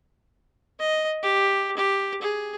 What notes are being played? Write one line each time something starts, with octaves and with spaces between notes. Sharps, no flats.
D#5
G4
G4
G#4